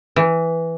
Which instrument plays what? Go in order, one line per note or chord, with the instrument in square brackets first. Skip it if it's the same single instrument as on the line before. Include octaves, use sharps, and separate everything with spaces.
[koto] E3